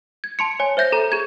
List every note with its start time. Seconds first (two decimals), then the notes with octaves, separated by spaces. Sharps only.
0.24 G#6
0.39 A5 C6 C#7
0.60 C#5 G#5
0.77 C5 E5 G6 A#6
0.92 A4 A#5
1.12 G#4 G#6